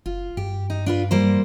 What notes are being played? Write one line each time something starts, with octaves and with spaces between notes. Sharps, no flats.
F#1 F4
G2 G4
D#4
D4 F4 B4
G3 A#3 C5